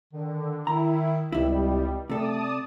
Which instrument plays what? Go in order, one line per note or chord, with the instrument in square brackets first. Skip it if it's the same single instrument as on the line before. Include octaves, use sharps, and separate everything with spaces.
[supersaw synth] D3 [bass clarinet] D#3
[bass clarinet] D#3 [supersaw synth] E4 [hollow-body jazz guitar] A#5
[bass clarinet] C#2 [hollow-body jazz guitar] C3 E4 [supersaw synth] G3
[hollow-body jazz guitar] C3 A4 [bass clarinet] A3 [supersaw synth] D5 A5 D#6